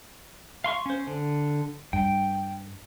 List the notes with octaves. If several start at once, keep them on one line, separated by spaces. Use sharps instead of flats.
F5 C6 C#6
C#4 C5
D3
G2 G5